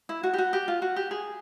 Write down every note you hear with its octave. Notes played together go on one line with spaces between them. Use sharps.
E4
F#4
G4
F#4
G4
F4
F#4
G4
G#4